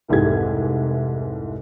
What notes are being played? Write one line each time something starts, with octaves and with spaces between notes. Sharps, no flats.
F1 C2 G#2 E3 G4 G#6